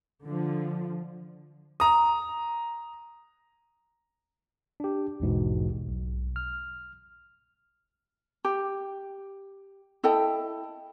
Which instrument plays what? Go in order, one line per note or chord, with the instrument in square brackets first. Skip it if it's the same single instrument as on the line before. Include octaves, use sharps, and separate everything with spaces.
[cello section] D3 F3
[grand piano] A#5 D#6
[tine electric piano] D4 G4
A#1 E2 G#2 B2
B1
F6
[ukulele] G4
E4 A4 D#5 G5